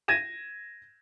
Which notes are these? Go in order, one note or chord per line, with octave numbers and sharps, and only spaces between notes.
G#6 A#6 D#7 E7